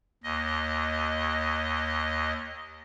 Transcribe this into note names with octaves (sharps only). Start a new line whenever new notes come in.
D#2 D#5